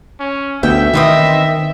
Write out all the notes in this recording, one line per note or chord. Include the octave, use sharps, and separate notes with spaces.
C#4
D2 B3 E5 G5
D#3 E3 C4 D#5